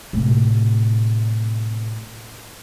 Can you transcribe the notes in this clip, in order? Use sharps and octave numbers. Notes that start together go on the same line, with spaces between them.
A2 C3